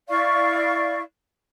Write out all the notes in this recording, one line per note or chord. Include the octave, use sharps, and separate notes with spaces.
E4 D5 F5 C#6